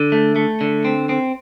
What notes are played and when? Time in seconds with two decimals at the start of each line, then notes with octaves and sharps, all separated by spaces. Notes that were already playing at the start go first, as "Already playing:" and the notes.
Already playing: D3
0.12 A3
0.36 A3
0.61 D3
0.85 C4
1.09 C4